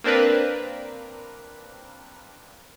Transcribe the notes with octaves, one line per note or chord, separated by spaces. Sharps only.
A#3 C4 D4 A#4 B4